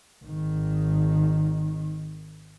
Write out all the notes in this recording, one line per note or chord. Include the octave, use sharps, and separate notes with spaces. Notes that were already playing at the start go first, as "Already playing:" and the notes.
G#1 D#3